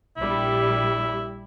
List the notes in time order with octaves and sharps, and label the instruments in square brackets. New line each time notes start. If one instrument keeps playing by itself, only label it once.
[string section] A#1 G3 [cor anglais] E4